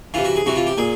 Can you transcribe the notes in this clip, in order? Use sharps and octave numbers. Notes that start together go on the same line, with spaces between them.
C3 E3 F4
F#4
G#4
C3 E3 F#4
F4
G4
A#2 G#4